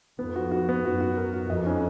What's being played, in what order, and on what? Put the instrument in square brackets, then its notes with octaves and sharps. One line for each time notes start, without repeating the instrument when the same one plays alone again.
[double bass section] F2 [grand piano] B3
[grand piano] F#4
F#4
B3
[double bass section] F#2 [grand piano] F#4
[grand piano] F#4
A#4
F#4
[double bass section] F2 [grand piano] D#5
[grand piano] C#4